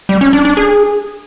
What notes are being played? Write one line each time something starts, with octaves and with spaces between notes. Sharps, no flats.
G3
C#4
D4
D4
G#4